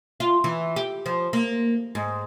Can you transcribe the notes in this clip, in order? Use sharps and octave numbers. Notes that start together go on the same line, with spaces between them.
F4
E3
G4
F3
A#3
G#2